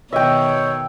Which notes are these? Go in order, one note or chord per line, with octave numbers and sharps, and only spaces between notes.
B2 D#3 C#5 D#5 E5 G5